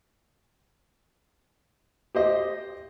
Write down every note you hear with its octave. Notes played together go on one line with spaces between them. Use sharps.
G4 C5 D#5